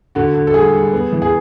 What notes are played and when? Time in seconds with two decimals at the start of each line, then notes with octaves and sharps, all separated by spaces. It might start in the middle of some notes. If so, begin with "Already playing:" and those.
0.15 D3 F#4
0.34 D3
0.47 A4
0.53 G3 G#4
0.73 G3
0.93 B3
1.12 E3
1.22 G#4